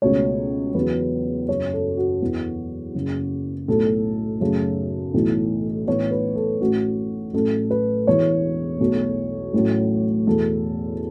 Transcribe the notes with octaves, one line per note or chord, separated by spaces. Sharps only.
C#2 B2 A3 C#5
E2 C#3 F#3 B3 B4
F#1 F#2 F#3 C#5
A4
F#4
E1 E2 E3 B3
F#1 F#2 C#3
B1 A2 A3 A4
F#2 C#3 A3
B1 A2 E3
A1 A2 E3 B3 C#5
B4
A4
A1 A2 A3 F#4
A1 A2 F#3 A3 A4
B4
E1 E2 E3 C#5
B1 B2 A3
A1 A2 F#3 A3
E2 B2 A3 A4